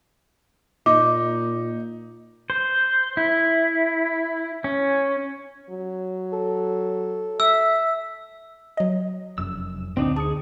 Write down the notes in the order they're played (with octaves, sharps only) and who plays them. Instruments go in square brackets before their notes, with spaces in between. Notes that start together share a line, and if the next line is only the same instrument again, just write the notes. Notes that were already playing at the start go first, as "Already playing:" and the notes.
[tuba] A#2 [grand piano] D#4 [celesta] D6
[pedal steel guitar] C5
E4
C#4
[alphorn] F#3
[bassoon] A4
[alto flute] E5 [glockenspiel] E6
[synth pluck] F#3 D#5
[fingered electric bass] F1 F#2 C#4 [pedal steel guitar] E6
[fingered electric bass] D2 [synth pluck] A#2 [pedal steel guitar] C4 D4 D#4
[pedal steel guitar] G#4 [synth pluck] A5 D#6 C#7